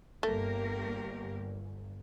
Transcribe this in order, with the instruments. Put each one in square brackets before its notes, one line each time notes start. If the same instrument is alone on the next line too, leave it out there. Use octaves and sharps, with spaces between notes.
[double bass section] G1 [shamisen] A3 [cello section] A#3 G4 A#4